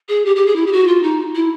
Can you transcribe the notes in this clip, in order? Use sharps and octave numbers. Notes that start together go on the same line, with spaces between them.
G#4
G4
G4
G#4
E4
G4
F#4
F4
D#4
E4